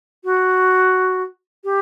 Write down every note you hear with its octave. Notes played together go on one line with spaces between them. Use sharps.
F#4
G4